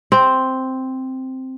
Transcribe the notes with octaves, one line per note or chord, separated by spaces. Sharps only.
C4